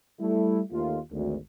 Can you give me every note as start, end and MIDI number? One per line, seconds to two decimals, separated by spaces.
0.20 0.60 55
0.20 0.60 57
0.20 0.60 64
0.71 0.98 39
0.71 0.98 51
0.71 0.98 57
0.71 0.98 65
1.12 1.36 32
1.12 1.36 38